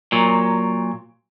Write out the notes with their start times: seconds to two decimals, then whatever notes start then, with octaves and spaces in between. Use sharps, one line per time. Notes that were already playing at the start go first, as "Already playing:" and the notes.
0.12 A#2 F#3